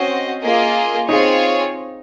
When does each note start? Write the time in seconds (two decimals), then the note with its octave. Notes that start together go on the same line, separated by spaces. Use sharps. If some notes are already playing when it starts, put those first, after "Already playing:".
Already playing: C4 C#4 F#4 C5 D#5
0.42 A#3 F4 G#4 D#5
1.08 C4 D#4 F4 G#4 C#5